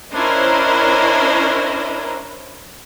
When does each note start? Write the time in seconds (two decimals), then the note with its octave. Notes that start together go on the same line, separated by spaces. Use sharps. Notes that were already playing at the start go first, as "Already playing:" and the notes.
0.12 C#4 D4 E4 A#4 C5 D#5